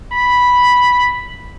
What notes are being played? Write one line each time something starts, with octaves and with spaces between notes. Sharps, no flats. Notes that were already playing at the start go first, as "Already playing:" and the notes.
B5